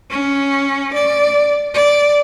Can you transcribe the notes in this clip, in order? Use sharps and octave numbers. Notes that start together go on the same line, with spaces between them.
C#4
D5
D5